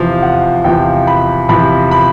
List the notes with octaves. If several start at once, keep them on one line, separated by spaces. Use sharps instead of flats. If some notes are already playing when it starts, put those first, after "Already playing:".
Already playing: E2 C3 F3 F5
F#5
E2 C3 F3 G5
B5
E2 C3 F3 B5
B5